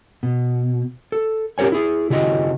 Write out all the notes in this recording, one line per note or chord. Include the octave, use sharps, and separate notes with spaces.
B2
A4
C#4 G4 A#4 C#5 G#5
E4 G#4
C#3 E4 F#4 C#5 D#5